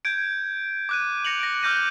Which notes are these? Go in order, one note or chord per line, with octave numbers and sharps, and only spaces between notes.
G6 G#6 D7
D6 F#6 D#7
A#6 C#7 F7 F#7
A#6 D7
D6 F6 G6 A#6 D#7